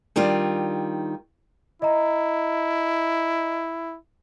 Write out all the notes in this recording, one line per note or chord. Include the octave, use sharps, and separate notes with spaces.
D#3 G3 D4 F4
E4 D#5 A#5